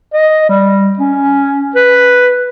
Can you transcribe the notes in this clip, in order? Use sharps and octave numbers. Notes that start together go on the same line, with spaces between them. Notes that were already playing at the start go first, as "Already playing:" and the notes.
D#5
G3
C#4
B4